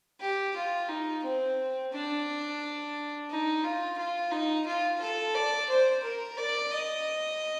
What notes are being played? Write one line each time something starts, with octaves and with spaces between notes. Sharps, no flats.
G4
F4
D#4
C4
D4
D#4
F4
F4
D#4
F4
A4
D5
C5
A#4
D5
D#5